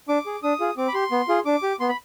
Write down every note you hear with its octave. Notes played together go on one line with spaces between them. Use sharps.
D4 D6
G#4
D4 D#6
F4 G#4
C4 D6
B5
G4 C6
B3
F4 G#4
D4 D6
G4
B3 C6
B5